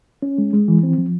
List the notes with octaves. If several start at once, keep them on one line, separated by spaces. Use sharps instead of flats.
C#4
G#3
G#3
E3
C4
F3